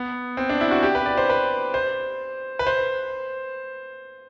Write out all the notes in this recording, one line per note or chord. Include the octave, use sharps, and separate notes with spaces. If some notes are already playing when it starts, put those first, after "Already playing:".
Already playing: B3
C4
D4
E4
F#4
G4
B4
D5
C5
B4
C5
B4
C5